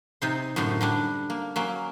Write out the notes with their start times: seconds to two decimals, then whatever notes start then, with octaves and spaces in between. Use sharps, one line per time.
0.22 C3 D#4 C5
0.56 F#2 A2 D3 C5
0.81 D3 G3 D4
1.30 A#3
1.56 F#3 A#3 C#4